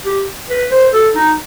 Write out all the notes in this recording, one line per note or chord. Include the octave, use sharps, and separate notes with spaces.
G4
B4
C5
A4
D#4